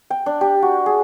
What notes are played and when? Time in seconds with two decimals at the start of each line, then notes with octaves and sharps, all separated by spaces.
0.10 G5
0.26 D4
0.41 G4
0.62 F#4
0.86 G#4